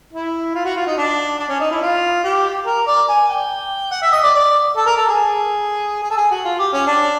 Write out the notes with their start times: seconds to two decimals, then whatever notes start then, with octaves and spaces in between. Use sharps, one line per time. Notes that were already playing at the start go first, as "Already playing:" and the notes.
0.13 E4
0.55 F4
0.65 F#4
0.76 F4
0.87 D#4
0.97 D4
1.39 D4
1.49 C#4
1.60 D#4
1.71 E4
1.82 F4
2.24 G4
2.66 A#4
2.87 D5
3.08 G#5
3.29 G5
3.91 F#5
4.02 E5
4.12 D#5
4.23 D5
4.34 D5
4.77 A4
4.86 A#4
4.97 A4
5.08 G#4
6.03 G#4
6.10 A4
6.17 G#4
6.31 F#4
6.45 F4
6.59 G4
6.73 C#4
6.87 D4